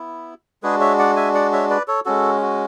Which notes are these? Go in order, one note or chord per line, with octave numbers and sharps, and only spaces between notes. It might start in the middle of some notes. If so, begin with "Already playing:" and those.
Already playing: B3 E4
G#3 D4 F#4 G#4 B4
C#5 E5
D5 F#5
E5 G#5
D5 F#5
C#5 E5
B4 D5
A4 C#5
G#3 C#4 F#4 A4
F#4